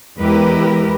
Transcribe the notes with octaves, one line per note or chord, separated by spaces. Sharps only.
E2 G#3 E4 G4 A#4 B4